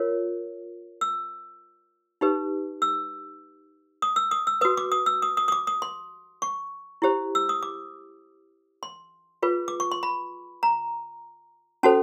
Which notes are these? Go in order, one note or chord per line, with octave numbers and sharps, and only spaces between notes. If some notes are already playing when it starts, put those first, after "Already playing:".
Already playing: F4 A#4 C#5
E6
D#4 G4 B4
E6
D#6
E6
D#6
E6
F#4 B4 D#6
D6
D#6
E6
D#6
D#6
D#6
D6
D#6
C6
C#6
E4 G4 C5
E6
D#6
D6
C6
F4 G#4 B4
D6
C#6
C6
B5
A#5
C#4 F#4 A4 C5 A5